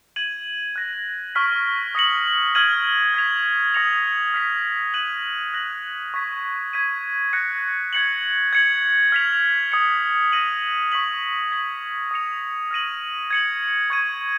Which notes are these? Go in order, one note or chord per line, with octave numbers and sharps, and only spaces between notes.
G#6 D#7 F#7
F#6 A#6 D#7
C#6 F6 B6
D#6 A#6 C#7 F#7
F6 G#6 D#7 F#7
G#6 B6 F7
D#6 A#6 C#7 F7
F6 B6 F7
F#6 A#6 D#7 F#7
F#6 A#6 D#7 F#7
C#6 F6 G#6 B6
G#6 B6 D#7
F#6 A#6 C#7
G#6 C#7 F#7
G#6 C#7 F#7
F6 B6 F7
D#6 G#6 C#7
F#6 A#6 D#7 F#7
C#6 F6 B6 F#7
G#6 B6 F#7
D#6 A#6 C#7 F7
F6 A#6 D#7 F#7
G#6 C#7 F#7
C#6 G#6 D#7